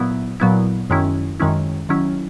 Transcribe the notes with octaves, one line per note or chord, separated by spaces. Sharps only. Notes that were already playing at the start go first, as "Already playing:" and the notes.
Already playing: A#2 F#3 B3 E4
A#2 F#3 B3 E4
F#2 D#3 G#3 C#4 E4
F#2 D#3 G#3 C#4 E4
D#3 F#3 C#4 E4